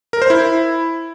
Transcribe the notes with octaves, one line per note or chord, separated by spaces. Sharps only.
A#4
C5
E4